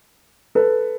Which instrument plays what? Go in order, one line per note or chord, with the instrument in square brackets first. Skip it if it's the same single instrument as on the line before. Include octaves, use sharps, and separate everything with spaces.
[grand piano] A4 B4